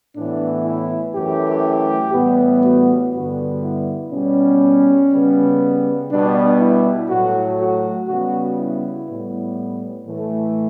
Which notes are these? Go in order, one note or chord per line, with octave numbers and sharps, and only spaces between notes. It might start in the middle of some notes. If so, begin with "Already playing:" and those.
A2 E3 B3 D4
E4
F#2 E3 A3 G4
A2 E3 G3 B3
F#4
G2 D3 G3 B3 F#4
E4
B2 G3 B3 C#4
C#3 G3 B3
B2 G3 B3 D4
E4
A2 F#3 A3 F#4
F#4
C#3 G3 B3 F#4
E4
A2 G3 B3
A2 E3 A3